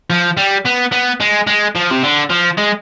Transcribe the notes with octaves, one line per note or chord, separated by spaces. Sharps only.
F3
G3
B3
B3
G#3
G#3
F3
C3
D3
F3
G#3